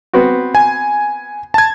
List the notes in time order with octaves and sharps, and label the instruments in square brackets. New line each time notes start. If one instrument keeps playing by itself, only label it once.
[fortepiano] B3 C4 F#4
[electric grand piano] G#5
A5 G#6